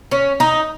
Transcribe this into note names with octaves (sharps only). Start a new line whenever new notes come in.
C#4
D#4